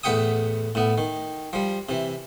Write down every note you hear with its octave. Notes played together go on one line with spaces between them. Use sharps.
E2 A2 B4 F#5 G5 D#6
A2 B3
D#3
F3 G3
C3 E3